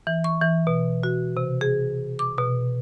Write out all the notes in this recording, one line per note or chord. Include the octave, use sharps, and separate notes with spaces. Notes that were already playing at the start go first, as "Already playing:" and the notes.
E3
C#6
E3
B2
F#4
C3
G#4
D6
B2